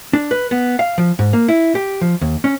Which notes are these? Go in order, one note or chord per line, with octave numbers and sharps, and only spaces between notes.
D4
B4
B3
F5
F3
G#2
A#3
E4
G4
F3
D#2
C#4